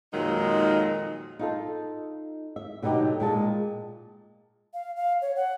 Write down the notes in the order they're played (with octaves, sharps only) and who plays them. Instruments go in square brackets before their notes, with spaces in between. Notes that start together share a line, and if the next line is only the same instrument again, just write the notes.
[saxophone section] F2 A#2 D#3 F#3 G#3 D#4
[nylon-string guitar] D#4 F4 A4
E5
B2 D3 F#3 D#4 G4
A#2 G#3 A5
[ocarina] F5
F5
C#5
F#5